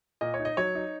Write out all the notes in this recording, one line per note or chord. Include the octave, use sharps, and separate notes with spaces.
A#2 D#5
C#5
D#4
D#5
F#3 C#5
D#4